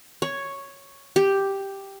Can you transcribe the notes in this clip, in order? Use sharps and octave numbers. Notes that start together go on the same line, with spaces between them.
C#5
G4